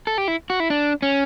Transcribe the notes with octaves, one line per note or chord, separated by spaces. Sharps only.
A4
G4
E4
F#4
E4
D4
C#4